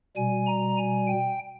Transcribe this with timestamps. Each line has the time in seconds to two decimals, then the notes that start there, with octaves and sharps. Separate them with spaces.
0.16 B2 G3 G#5
0.47 A#5
0.77 G#5
1.07 G5